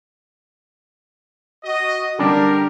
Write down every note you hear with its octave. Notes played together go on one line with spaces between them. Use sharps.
F#4 D#5
D3 G3 D4 G4 A#4